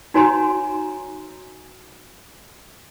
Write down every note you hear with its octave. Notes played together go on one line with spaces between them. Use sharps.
D#4 F#4 C#5 G#5 A#5 C6